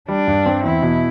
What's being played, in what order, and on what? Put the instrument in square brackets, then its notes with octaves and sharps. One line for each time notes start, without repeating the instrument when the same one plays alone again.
[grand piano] G3 [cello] D4
[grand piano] G2
C4
[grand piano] E2 [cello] E4
[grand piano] B2